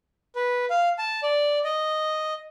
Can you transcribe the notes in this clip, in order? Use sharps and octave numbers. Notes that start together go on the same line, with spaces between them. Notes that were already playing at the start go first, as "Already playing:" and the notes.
B4
F5
A5
D5
D#5